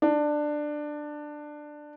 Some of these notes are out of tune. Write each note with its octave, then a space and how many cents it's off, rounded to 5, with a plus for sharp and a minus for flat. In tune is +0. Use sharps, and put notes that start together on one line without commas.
D4 +15